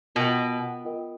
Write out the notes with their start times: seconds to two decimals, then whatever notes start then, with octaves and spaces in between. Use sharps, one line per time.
0.15 B2 F4 A#4 D#5 G5
0.85 F4 A#4 D#5 G5